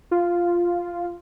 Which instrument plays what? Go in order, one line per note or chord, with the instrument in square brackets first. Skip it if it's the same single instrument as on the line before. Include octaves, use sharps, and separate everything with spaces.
[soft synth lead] F4